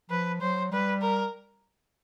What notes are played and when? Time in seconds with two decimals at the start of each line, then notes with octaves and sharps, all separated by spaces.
0.10 F3 B4
0.41 F#3 C5
0.72 G3 B4
1.01 A#4